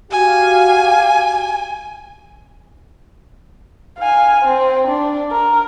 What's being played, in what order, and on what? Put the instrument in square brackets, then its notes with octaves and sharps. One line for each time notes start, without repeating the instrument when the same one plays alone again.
[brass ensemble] F#4 G4 F5 [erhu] G#5
[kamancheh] F5 G#5
C4
D4
A#4